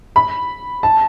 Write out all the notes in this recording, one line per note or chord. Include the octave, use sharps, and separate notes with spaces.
B5
A5